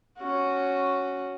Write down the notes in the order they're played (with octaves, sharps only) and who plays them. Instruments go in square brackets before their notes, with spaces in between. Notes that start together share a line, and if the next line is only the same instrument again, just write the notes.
[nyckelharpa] C#4 F#4